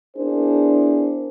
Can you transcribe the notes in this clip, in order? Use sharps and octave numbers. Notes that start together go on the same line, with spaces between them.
B3 D4 E4 G#4 A#4 C5